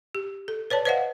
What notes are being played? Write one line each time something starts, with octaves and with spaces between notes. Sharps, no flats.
G4
A4
B4 C#5 D5 A5
B4 C5 D5 D#5 F5 F#5